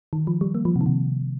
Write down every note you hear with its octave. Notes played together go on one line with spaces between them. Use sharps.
D#3
F3
G3
A#3
F3
C3
D#3
C3